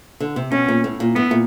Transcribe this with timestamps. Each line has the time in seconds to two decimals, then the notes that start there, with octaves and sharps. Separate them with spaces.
0.20 D3
0.36 C3
0.51 B2 C#4
0.68 A#2
0.84 A2
1.00 A#2
1.15 A2 B3
1.31 A#2